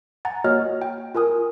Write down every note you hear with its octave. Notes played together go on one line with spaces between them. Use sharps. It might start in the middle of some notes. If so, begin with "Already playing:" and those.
F#5 G#5 A#5 A6
A#3 F#4 C#5 D#5 F6
G5
F4 A#4 G#5 D#6